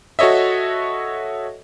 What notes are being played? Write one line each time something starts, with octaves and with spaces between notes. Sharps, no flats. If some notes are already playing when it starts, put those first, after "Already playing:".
F#4 A4 C#5 D#5 E5